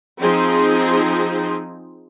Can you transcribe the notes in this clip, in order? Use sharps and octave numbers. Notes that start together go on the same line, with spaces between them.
F3 C4 D#4 G#4